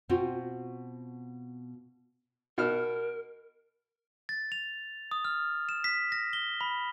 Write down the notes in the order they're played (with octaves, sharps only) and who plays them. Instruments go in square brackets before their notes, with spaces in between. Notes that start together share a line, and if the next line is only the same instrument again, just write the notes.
[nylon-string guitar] B2 C4 F4 F#4
[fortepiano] B2 F6 [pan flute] A#4
[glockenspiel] A6
F7
D#6
F6
E7
B6
A#6
G7
B5